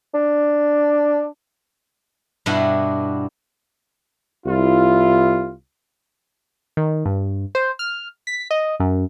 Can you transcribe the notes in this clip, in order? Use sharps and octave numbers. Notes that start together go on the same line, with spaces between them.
D4
G2 B2 B3 D4 E4
C2 E4 F4
D#3
G2
C5
F6
B6
D#5
F#2